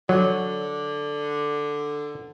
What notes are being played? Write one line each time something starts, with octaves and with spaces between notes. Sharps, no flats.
D3 F#3